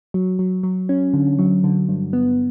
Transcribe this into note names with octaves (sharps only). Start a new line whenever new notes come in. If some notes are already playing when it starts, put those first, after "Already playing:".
F#3
F#3
F#3
C#4
D3
F#3
D3
G2
B3